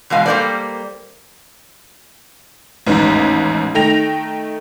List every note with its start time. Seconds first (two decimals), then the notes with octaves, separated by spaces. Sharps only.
0.10 E2 B2 G#3 F5 G#5
0.26 G3 A#3 B3 A4 C5 D5
2.86 A1 D#2 G#2
3.75 D#3 A3 G5 A#6 F7